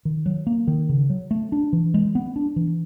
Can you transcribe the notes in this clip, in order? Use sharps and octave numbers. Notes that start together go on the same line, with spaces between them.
D#3
F#3
A#3
D#3
C#3
F#3
A3
D4
E3
G#3
B3
D4
E3